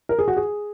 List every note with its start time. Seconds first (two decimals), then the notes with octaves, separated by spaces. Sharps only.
0.09 A#4
0.19 G#4
0.28 F#4
0.36 G#4